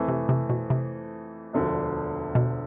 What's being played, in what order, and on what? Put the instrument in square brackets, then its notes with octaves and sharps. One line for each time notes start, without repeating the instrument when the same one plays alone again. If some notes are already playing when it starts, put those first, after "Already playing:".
Already playing: [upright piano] F2 E3 A3
[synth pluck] C3
C3
B2
C3
[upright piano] E1 D2 D3 F3
[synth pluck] B2